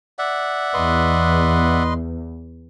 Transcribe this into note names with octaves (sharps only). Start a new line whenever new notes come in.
D5 E5 F#5
E2 B4 D#5 C6